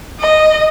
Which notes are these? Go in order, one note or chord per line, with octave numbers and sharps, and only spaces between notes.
D#5